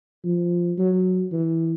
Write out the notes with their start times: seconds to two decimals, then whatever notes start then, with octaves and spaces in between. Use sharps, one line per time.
0.24 F3
0.78 F#3
1.32 E3